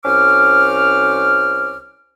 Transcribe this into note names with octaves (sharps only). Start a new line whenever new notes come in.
C2 C#4 C5 D6 F6